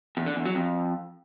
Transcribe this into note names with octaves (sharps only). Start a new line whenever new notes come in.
E2
D3
E2
F#3
F2